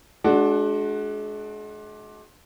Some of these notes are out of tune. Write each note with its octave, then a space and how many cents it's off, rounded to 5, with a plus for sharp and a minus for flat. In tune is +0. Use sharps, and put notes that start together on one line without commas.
G#3 +35 D4 +0 F#4 +0